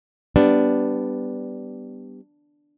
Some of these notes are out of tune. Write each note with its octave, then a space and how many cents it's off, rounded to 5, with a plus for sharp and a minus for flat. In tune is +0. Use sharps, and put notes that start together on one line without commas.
G3 +0 B3 +15 D4 +0